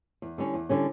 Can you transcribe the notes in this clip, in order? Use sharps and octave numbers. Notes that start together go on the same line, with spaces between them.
E2
D3 G3 C#4
E2
D3 G3 C#4